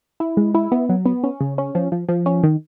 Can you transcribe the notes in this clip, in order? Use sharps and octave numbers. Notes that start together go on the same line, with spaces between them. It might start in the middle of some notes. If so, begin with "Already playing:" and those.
E4
G#3
E4
B3
F#3
B3
C#4
C#3
C#4
F3
F3
F3
C#4
D#3